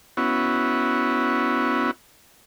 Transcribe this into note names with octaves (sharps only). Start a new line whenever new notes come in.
B3 C#4 E4 F#4